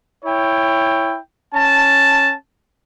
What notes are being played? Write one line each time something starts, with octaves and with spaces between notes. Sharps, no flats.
E4 C#5 G5
C#4 A5